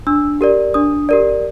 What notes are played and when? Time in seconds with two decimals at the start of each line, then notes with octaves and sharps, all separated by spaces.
0.07 D4 E6
0.41 G4 A#4 D5
0.74 D4 D#6
1.09 G4 A#4 D5